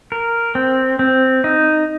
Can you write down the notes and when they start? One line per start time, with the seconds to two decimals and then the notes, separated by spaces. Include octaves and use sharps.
0.12 A#4
0.55 C4
0.99 C4
1.44 D#4